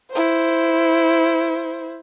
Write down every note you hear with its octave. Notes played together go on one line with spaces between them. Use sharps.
E4 C5